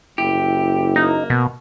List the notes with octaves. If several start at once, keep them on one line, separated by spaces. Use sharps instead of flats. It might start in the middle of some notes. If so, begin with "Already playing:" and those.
F#1 E4 G4
A#3 D#4
B2